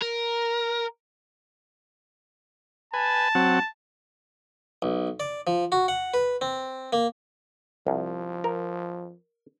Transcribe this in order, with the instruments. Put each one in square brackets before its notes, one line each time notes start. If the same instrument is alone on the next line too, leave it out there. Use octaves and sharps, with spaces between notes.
[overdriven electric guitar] A#4
[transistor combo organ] B4 G#5 [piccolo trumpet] A5
[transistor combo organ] F#3 C4 F#5
[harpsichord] B1
D5
F3
F#4
F#5
B4
C4
A#3
[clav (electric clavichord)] C2 [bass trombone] F3
[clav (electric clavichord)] A#4